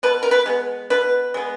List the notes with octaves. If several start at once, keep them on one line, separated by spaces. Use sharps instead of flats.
B2 B4
A#4
B4
G#3 B3
B2 B4
G#3 B3